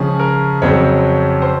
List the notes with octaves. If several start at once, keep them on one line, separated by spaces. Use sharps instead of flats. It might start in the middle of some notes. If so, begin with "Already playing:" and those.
Already playing: C#3 F3 G#3 C#4 G#4
A#4
F2 C#3 F#3 C4 C#5
C5